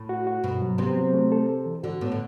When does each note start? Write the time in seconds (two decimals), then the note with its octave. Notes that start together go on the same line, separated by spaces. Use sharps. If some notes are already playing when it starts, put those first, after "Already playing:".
Already playing: A2
0.09 F#4
0.27 F#4
0.44 G2 B2
0.62 F#3
0.78 C3 B3
0.97 F#3
1.13 A3
1.32 A4
1.49 A4
1.66 E3
1.83 D3 F#4
2.01 A2 B3
2.12 D3